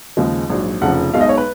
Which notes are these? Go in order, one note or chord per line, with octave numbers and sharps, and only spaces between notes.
D#2 C#3 F3 G#3 D#4
A#1 G#2 F#3
F1 F2 C#3 F3 F#5
B1 B2 G#3 D#4 F5
D#5
C#5
B4